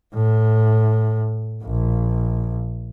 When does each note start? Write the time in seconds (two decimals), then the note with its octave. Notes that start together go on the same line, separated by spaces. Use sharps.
0.15 A2
1.64 A#1